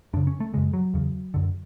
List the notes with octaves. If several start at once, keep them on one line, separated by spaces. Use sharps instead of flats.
F#2 C#3 D4
C#4
A3
F#2 C#3 G#3
F#3
E2 C#3
F#2 D3